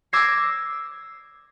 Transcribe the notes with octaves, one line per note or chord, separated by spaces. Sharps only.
D6 E6 G#6 A#6 C7